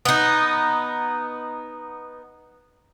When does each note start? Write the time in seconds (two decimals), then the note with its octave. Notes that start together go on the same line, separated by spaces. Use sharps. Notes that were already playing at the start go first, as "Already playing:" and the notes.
0.05 B3 D#4